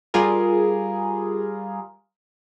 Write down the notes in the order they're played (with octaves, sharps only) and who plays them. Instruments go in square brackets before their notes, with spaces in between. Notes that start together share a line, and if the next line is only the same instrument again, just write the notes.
[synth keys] G3 F4 G#4 A#4